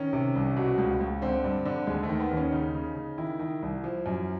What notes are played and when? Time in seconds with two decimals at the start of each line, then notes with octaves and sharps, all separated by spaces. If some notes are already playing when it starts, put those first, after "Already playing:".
Already playing: D#3 C#4
0.13 C3
0.35 C2
0.57 B2
0.78 C#2
1.01 C#2
1.22 D3 C4
1.44 G2
1.65 D3
1.87 D#2 G#3
2.03 A3
2.09 D#3
2.20 B3
2.31 D#2
2.37 C#4
2.52 C#3 D#4
2.74 C#3
2.96 C#3
3.18 D#3 E4
3.39 D#3
3.62 C2
3.84 F3
4.06 F#2